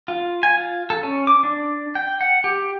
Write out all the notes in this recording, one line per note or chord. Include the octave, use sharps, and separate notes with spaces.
F4
G#5
F4
A4
C#4
D6
D4
G5
F#5
G4